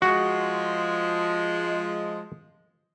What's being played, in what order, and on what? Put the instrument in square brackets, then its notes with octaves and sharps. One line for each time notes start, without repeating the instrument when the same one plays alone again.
[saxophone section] F3 G#3 [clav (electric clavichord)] F#4